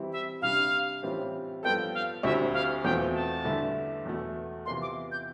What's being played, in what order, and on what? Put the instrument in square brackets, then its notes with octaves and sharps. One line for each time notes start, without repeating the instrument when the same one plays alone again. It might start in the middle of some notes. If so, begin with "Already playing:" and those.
Already playing: [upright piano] E3 G3 C4 E4
[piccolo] E5
[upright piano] C3 G3 D4 [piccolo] F5
[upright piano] A2 E3 G3 C4 F4
[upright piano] G2 F3 B3 F4 A4 [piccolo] G5
[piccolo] F5
[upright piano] D2 D3 G3 C4 E4 [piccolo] E5
[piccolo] F5
[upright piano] E2 B2 A3 C4 F4 [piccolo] G5
[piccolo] A5
[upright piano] G2 D3 A3 E4
E2 B2 A3
[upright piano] C3 E3 B3 F4 [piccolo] C6
[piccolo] D6
G6